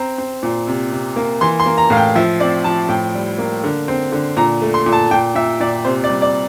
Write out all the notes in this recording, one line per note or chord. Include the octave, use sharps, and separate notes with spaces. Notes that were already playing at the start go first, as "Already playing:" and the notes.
Already playing: C4 A#5
C4
A#2
C3
C3
A#3
E3 C6
C6
A#3
A#5
A2 F5
G5
F3 E5
C4 D5
F3 A5
A2 G5
G3
A#3
D3
C4
D3
A#2 A#5
A3
C6
A#2
A5
A#2 G5
A#2 E5
A#2 D5
C3 C5
D5
G3
D5